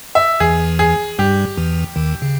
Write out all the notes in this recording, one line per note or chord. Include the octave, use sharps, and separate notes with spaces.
E5
E2 E3 G#4
G#4
G2 G3 G4
E2 E3
D#2 D#3
C#3